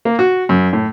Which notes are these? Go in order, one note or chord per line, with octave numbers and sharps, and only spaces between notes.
A#3
F#4
F#2
A2